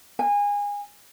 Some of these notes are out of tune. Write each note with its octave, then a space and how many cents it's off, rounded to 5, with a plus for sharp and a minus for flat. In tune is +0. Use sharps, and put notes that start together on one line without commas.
G#5 -25